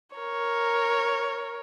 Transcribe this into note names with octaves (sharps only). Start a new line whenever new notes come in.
A#4 C#5